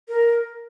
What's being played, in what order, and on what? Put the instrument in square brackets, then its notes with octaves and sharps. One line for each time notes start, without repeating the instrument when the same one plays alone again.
[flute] A#4